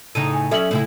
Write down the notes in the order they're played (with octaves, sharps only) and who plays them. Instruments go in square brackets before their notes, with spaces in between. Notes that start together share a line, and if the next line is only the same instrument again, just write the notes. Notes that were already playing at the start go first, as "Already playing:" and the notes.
[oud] A2 C#3 D#4 [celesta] D#7
[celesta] G#5
[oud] F#3 C#4 E5 [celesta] A4 F#7
[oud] A2 C#3 E4